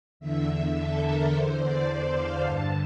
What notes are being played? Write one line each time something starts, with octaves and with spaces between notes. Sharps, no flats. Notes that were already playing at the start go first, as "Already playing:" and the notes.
E2 D3 E5
E5
A4
A#4
E2 D3 C5
D5
D5
F5
G2 D3 A5